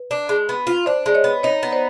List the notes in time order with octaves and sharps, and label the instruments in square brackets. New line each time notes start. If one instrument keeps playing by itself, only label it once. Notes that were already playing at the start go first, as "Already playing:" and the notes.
Already playing: [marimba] B4
[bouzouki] D4
G#3
B3
F4
[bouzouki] D4 [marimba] C5 D5
[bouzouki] G#3 [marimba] D5
[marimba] C#5 D#5
[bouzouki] B3
[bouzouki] D#4 [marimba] C#5 D#5
[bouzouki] B3
[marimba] C5 D5